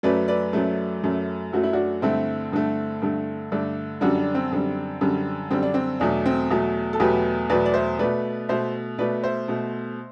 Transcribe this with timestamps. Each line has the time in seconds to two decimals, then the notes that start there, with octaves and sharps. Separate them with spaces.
0.03 F#2 F#3 A3 B4 D5
0.28 B4 D5
0.53 F#2 F#3 A3
1.03 F#2 F#3 A3
1.53 F#2 F#3 A3 F#4
1.63 E4
1.73 D4 F#4
2.02 G2 D3 A3 C4 E4
2.52 G2 D3 A3
3.02 G2 D3 A3
3.52 G2 D3 A3 D4
4.01 F#2 D3 G3 D4 F#4
4.18 D4
4.35 C4
4.51 F#2 D3 G3
5.01 F#2 D3 G3
5.51 F#2 D3 G3 C4
5.63 D4
5.74 C4
6.00 E2 B2 F#3 A3 D4
6.26 C4
6.50 E2 B2 F#3 A3
6.93 A4
7.00 E2 B2 F#3 A3 G4 B4
7.50 E2 B2 F#3 A3 B4 D5
7.65 D5
7.74 C5 E5
7.99 B2 A3 B4 D5
8.49 B2 A3 C5 E5
8.98 B2 A3 B4 D5
9.23 C5 E5
9.48 B2 A3